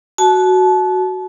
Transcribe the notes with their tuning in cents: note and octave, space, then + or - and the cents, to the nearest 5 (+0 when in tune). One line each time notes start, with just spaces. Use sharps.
F#4 +0 A5 -30